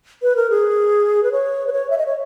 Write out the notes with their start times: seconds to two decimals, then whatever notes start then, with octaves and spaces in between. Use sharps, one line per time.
0.22 B4
0.36 A#4
0.50 G#4
1.23 B4
1.32 C#5
1.67 B4
1.72 C#5
1.90 E5
1.98 D#5
2.06 C#5